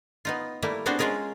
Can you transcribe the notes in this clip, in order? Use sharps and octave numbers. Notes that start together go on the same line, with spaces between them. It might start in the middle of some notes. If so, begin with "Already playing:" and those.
B3 D#4 F4
G3 A3 A#3 E4
B3 C4 D4 F#4 G#4 C5
G#3 C#4 F4 G#4 A#4